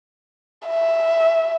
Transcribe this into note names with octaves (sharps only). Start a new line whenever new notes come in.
E5